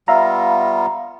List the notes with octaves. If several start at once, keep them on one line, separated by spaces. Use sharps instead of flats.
G3 B3 F4 E5 F5 A#5